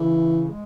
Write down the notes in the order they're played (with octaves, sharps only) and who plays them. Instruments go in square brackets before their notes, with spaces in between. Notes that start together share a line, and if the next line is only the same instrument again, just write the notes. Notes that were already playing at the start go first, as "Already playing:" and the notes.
Already playing: [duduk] C#3 [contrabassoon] E3
[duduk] G#3